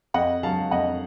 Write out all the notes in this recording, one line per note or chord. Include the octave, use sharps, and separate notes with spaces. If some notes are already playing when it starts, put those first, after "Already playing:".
F2 D#5 F#5
F#3 F5 A5
F2 D#5 F#5